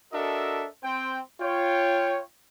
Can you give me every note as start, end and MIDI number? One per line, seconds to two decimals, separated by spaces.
0.13 0.66 62
0.13 0.66 66
0.13 0.66 69
0.13 0.66 70
0.13 0.66 75
0.13 0.66 76
0.83 1.19 60
0.83 1.19 72
0.83 1.19 79
1.41 2.22 65
1.41 2.22 73
1.41 2.22 79